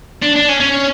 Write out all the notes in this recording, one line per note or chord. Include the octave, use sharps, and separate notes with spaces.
D4
D4
C#4
C#4